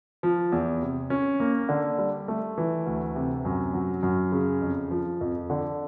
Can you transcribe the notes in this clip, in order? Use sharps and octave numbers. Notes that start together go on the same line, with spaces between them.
F3
E2
C3
C#4
A#3
D3
G3
A3
E3
D2
C3
F#2
F#3
F#2
C#3
F2
F3
F2
D3